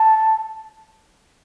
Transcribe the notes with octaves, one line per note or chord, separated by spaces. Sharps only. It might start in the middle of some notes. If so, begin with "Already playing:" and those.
Already playing: A5